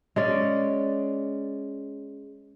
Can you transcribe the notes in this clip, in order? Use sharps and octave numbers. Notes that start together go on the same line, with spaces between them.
G#3 C#4 D5